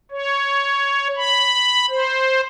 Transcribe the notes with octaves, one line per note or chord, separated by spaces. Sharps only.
C#5
B5
C5